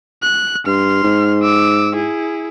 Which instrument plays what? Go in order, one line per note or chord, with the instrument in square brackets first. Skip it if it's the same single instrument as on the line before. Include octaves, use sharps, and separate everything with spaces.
[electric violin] F#6
[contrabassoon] G2 [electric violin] C6 F6
[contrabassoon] G#2
[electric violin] D6 E6
E4 G#4